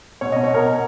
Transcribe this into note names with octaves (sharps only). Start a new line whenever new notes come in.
B2 C#5
B2 D#5
C#5
B2 A#4
B2